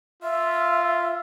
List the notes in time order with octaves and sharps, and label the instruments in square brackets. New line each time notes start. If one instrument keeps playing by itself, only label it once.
[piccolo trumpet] F4 [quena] E5